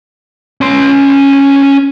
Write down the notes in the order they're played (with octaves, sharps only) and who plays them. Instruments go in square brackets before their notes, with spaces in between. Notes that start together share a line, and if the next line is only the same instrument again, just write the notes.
[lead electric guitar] C#4 C6